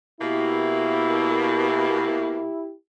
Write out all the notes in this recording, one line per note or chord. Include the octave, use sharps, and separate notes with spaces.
B2 A#3 E4 G4